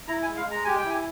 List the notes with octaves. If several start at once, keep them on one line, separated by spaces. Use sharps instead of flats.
E4 A#5
G#5
G#3
F5
G#3
A#5
G4 G#5
G5
E4
G#5